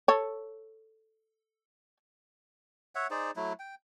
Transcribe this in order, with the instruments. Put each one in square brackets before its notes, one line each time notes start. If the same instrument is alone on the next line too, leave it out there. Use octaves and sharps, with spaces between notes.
[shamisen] A4 C#5
[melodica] C#5 E5 F#5
D#4 G#4 C5 D5
F#3 A3 E4
G5